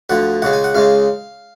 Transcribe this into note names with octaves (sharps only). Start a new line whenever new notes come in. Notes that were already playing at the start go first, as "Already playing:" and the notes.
D2 D3 F3 F#5
C#2 C#3 G#3 F#5
G#5
F#5
C#2 C#3 G#3 F5